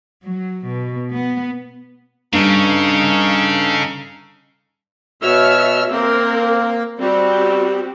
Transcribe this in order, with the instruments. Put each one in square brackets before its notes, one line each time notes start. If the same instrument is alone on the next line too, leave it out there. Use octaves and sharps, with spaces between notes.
[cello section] F#3
B2
B3
[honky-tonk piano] G2 [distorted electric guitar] C#3 [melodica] D#4 A4 F5
[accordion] B2 E6 F6 [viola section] F#4 C#5 E5
[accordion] A#3 [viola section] C4 A#4
[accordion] G3 [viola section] C4 F#4 G4